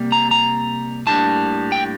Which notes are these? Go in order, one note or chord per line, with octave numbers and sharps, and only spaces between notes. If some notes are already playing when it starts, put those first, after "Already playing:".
Already playing: C3 G3 A#3
A#5
A#5
A2 G3 A#3 D4 A5
G5